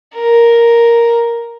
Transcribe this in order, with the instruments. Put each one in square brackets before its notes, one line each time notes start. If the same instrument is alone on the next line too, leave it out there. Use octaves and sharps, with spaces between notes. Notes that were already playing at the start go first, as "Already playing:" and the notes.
[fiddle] A#4